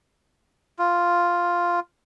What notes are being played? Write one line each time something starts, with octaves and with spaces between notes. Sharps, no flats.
F4